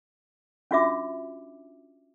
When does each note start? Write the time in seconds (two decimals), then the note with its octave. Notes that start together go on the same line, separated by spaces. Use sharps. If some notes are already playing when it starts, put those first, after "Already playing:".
0.71 C#4 D4 F4 F#4 E5 D6